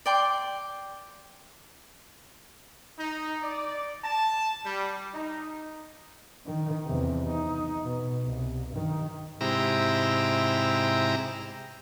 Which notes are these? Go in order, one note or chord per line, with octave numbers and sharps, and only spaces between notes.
D5 G5 C6
D#4
D5
A5
G3
D#4
D#3
E2 C3
D#4
B2
C2
G2 D#3
G#2 C3 E4 G4 A#5